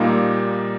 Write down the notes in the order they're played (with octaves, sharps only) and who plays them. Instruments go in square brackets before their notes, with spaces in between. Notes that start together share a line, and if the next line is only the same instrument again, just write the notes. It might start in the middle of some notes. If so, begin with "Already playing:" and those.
Already playing: [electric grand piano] A#2 G3 A#3 D#4